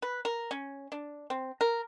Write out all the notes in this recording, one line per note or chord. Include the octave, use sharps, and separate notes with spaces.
B4
A#4
C#4
D4
C4
A#4